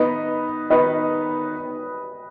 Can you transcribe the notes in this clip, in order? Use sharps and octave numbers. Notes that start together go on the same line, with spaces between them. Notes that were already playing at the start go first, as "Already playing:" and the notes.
Already playing: D#3 B3 D#4 B4 D#5
D#3 B3 D#4 B4 D#5